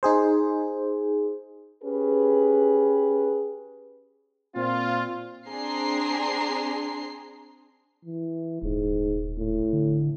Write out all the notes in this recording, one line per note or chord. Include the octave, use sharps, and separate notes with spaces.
D#4 G#4 C5
C#4 G4 G#4 B4
A#2 C4 F4
C4 D4 G#4 A#5 C6 C7
E3
D#1 G#2
A2
D3